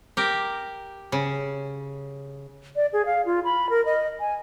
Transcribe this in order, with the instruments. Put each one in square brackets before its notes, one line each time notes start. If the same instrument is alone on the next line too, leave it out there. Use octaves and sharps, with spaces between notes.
[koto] G4 A#4
C#3
[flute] D5
G#4
F5
F4
B5
A#4
D#5
G#5